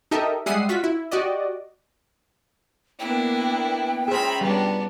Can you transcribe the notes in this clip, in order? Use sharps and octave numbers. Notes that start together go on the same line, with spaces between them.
D#4 G4 A4 A#4 D#5 E5
G3 G#3 E5 F#5 D#6 C7
F4 F#4 B6
E4
F#4 G4 D5 D#5
A#3 B3 D4 E4 G5
C#4 F4 G#4 C5 E5 A#5 B5
G3 B3 D4